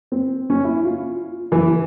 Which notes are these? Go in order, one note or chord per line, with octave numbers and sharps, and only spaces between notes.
C4
C#4
E4
F4
E3